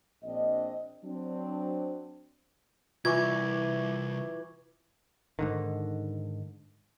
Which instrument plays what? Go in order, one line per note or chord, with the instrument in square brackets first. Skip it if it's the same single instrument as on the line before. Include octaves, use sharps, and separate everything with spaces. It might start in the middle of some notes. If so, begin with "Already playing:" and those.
[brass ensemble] A#1 C4 D4 D#5
F#3 C4 D4
[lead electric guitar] C2 [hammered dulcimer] E3 [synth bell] F4 C#6 D6 [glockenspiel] G#6
[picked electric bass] G#2 D3 D#3